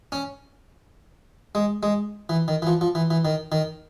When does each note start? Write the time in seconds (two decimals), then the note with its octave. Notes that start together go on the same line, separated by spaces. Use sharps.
0.12 C#4
1.55 G#3
1.83 G#3
2.29 E3
2.48 D#3
2.62 E3
2.67 F3
2.81 F3
2.95 E3
3.11 E3
3.25 D#3
3.52 D#3